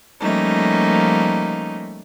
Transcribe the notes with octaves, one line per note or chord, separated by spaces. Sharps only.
F3 G3 A3 A#3 C#4 D#4